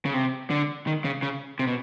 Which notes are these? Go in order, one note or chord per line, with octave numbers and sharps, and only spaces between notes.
C#3
C3
D3
D#3
C#3
C#3
C3
B2